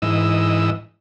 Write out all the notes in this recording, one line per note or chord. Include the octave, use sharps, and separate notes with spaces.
G#2 E3 D#5 E6